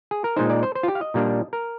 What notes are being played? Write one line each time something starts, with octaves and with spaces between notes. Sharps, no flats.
G#4
A#4
A#2 G#3 D#4 C5
D5
C5
C5
F4
G4
F5
D#5
A#2 G3 A#3 D4
A#4